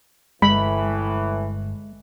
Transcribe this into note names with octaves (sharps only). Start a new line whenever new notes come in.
G1 A2 E3 G#3 B5